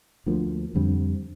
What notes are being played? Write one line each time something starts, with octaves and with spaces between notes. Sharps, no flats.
D2 D3 F3 A#3
F2 D3 G3 C4